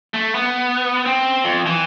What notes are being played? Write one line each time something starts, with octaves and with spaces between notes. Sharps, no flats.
A3
B3
C4
F2
E3